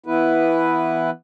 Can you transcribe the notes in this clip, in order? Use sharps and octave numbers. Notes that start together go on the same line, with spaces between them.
E3 B3 E4 B4